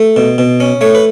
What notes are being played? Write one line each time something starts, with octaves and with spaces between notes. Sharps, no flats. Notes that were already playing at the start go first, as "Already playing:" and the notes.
Already playing: A3
B2
B2
C#4
A3 C#5
B4